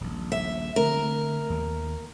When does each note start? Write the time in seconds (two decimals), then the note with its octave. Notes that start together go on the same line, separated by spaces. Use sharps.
0.01 D#1 A#1
0.32 E5
0.76 D3 A3 C4 A#4
1.50 D#2